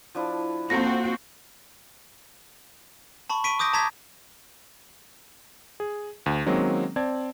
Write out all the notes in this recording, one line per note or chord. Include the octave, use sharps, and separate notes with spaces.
F3 D4 E4
F3 A#3 C4 F#4 A4 A#6
A5 B5 C#6
C#6 B6 D7 D#7
D6 D#6 G6 A#6 D7
A5 A#5 D6 G#6 B6
G#4
D2
D#3 F#3 G#3 A#3 C4 C#4
C4 D5 A5 G#6